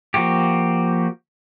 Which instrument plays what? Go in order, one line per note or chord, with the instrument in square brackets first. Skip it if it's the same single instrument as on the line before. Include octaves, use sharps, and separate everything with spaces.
[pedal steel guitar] F3 A#3 F#4 G4